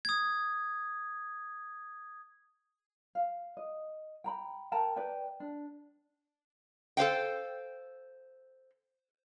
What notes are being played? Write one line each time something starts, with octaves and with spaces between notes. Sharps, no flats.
D#6 G#6
F5
D#5
G5 A#5 B5
A#4 G5 A5 A#5
B4 D5 G5
D4
A4 C5 F5 G5